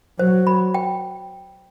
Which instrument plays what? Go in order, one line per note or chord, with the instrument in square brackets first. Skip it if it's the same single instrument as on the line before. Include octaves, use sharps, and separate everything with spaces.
[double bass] F#3 [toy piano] C5
[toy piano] B5
G5